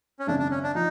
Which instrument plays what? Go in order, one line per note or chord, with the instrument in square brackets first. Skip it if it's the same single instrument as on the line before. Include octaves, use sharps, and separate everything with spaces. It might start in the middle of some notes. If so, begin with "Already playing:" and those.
[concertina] C#4
[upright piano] G#1 F#2 C#3 [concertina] D4
[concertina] D4
C#4
D4
[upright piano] F3 [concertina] D#4